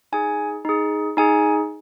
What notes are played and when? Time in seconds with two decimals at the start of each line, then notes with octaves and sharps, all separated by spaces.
0.12 D#4 G#4 G#5
0.65 D#4 G#4
1.17 D#4 G#4 G#5